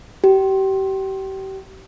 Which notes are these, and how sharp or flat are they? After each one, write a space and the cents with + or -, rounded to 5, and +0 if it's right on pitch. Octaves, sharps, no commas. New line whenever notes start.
G4 -30